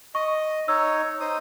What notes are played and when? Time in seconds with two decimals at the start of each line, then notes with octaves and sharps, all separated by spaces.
0.15 D#5 C#6
0.68 D#4 C#5 E6
1.21 D#4 C5 D#6